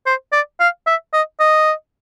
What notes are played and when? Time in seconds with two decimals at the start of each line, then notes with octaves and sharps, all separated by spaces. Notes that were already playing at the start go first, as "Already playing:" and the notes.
0.06 C5
0.32 D5
0.60 F5
0.87 E5
1.13 D#5
1.40 D#5